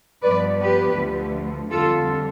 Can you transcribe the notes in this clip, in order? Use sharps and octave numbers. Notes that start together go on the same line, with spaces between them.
G2 F3 B3 B4 D5
G4 B4
D2 D3 F3 A3
F2 D3 G3 F4 A4